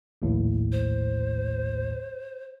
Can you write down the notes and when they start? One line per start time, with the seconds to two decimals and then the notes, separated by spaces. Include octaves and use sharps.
0.22 A#1 D#2 A2
0.72 C5